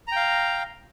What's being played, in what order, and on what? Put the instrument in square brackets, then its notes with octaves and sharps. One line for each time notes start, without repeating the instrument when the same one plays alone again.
[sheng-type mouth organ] A#5
G5
F5